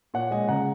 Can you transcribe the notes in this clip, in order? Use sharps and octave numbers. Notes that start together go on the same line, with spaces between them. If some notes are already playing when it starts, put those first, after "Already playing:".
A#2 C#5 F#5
G#3 D#5 G#5
C#3 F#5 A#5